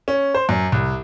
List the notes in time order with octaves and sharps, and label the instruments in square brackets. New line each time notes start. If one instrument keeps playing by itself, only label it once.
[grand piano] C#4
C5
F#2
C2